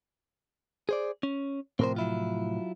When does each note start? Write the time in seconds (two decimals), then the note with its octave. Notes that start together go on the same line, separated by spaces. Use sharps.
0.89 G#4 C5 D5
1.23 C#4
1.79 A2 C3 F3 C4 A#4 C5
1.96 F#3 E4 F4